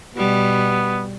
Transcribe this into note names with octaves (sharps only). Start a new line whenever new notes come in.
B2 G3 B3